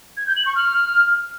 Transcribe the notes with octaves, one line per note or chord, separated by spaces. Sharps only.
G#6
G6
F#7
C#6
F6